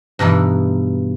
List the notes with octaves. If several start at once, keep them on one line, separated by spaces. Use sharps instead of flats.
G2 B2 E3 D#4